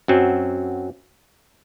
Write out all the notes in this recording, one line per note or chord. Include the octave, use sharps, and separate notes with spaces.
F#2 F#3 C4